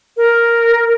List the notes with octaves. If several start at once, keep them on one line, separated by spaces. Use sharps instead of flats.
A#4